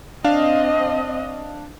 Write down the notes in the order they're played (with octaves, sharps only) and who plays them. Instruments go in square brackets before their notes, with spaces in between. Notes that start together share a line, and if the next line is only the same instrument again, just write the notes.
[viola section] C4 D#5 [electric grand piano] D4 F5